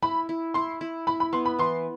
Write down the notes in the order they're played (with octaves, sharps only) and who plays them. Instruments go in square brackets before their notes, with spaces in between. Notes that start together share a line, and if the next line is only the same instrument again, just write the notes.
[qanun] E4 [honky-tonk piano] B5
[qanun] E4
[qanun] E4 [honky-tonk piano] C6
[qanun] E4
[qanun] E4 [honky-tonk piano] B5
[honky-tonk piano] B5
[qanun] B3 [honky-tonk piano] C6
[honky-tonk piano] B5
[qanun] E3 [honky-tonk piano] C6